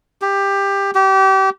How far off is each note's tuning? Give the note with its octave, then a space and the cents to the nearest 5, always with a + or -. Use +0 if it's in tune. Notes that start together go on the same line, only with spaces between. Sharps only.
G4 +15
G4 -30